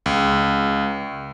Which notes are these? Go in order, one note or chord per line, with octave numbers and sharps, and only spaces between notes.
C#2